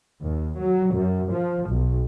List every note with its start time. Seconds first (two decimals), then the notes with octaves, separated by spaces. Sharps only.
0.24 D#2
0.59 F#3
0.97 F#2
1.31 F3
1.69 B1